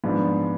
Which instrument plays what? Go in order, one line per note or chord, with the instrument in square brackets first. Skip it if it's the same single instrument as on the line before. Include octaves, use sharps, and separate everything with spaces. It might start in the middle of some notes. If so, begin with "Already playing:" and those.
[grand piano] G#2 F3 B3 D4